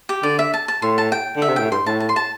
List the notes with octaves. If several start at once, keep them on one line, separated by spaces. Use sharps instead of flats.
G4
D3 D5
E5
A5
A5
A2 C6
A5
G5
D3
E5
C3
A2 G5
G2 C6
A2 A5
A5
C6
A5